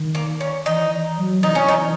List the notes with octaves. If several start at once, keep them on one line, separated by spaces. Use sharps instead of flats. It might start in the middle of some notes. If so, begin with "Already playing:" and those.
Already playing: D#3
A#3
C#4
E3 D#4
F#3
E3 D#4
C#4
D#4